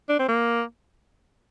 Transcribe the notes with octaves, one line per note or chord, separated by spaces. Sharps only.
D4
C4
A#3